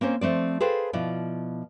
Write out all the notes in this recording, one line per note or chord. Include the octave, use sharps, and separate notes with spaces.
A#3 C4 C#4 C5
F3 A3 C4 D5
G#4 A4 B4 C5 F5 G5
B2 F3 E4 F4 D5